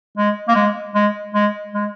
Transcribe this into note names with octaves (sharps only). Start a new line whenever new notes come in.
G#3
A#3
G#3
G#3
G#3
G#3